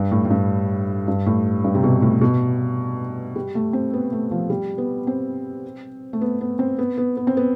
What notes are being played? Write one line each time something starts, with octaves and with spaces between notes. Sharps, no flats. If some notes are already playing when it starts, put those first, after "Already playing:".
Already playing: G2
A2
A2
G2
G2
A2
G2
C3
B2
A2
B2
G3
A3
C4
B3
A3
F3
G3
B3
C4
A3
B3
B3
C4
B3
B3
B3
C4
B3